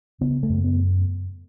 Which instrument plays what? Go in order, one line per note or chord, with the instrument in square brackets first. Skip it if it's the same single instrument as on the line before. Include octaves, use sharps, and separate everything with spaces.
[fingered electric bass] C#3 B3
A3
F#2
B3